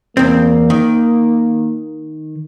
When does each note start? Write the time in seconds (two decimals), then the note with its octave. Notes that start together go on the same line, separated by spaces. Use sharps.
0.17 E2 A#3 C4
0.70 D#3